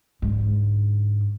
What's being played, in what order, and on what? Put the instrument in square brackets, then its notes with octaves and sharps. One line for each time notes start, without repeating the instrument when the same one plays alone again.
[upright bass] G#2 D3